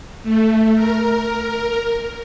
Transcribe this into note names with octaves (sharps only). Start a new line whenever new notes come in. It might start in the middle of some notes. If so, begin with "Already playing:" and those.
A3
A#4